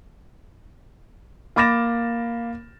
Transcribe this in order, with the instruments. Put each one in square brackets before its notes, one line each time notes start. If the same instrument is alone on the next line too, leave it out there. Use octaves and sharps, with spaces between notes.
[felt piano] A#3 B5 D6 A6 A#6 E7